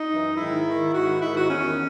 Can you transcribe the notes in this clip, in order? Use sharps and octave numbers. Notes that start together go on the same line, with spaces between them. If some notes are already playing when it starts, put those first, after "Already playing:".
Already playing: D#4
F#2 E3
G#2 D#3 E4
G#2 D#3
G#2 D#3 F#4
G#2 D#3 E4
F#4
E2 D#3 C#4